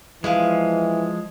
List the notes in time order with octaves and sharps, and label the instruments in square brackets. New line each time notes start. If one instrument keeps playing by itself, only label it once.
[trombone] E3 [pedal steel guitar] F3 G#3 [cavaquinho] E4 G#4 F5